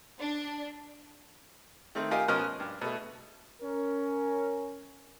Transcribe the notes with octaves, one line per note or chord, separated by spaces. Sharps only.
D4
D#3 A3 C4
F4 G4 A#4 D#5 F5 G#5
B2 F3 C#4 A#4 D#5 F6
F6
G2
B2 A3
C#4 A#4